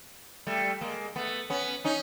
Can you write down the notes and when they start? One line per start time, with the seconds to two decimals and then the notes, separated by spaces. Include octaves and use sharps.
0.47 G3 A3
0.81 G#3 A#3
1.16 A3 B3
1.50 B3 C#4
1.85 C#4 D#4